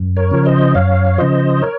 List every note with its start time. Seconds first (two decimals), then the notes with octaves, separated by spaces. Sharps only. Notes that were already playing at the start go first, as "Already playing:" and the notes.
Already playing: F#2
0.16 A#4 C#5
0.31 C#3 F3
0.45 C5 D#5
0.75 F#2 C#5 F5
1.18 C#3 F3 C5 D#5
1.62 A#4 C#5